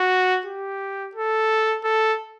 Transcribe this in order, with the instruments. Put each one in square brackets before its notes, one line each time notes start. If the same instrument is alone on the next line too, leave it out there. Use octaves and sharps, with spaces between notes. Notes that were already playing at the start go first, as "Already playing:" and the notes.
Already playing: [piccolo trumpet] F#4
G4
A4
A4